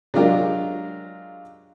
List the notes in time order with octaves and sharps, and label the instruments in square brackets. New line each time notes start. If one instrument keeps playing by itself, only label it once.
[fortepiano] F#3 G#3 D4 F4 G4 A#4